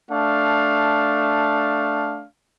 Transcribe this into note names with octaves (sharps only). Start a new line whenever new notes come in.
A3 D4 F5